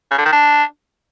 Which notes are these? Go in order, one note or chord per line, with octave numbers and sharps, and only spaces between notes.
C#3
D3
D#3
D4